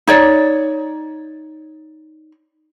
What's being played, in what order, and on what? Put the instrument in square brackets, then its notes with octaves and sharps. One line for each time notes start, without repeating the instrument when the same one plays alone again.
[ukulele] D#4 C#5 D5